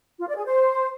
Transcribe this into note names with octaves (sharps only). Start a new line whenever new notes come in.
F4
D5
G#4
C5